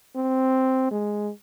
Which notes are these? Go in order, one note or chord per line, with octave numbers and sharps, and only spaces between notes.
C4
G#3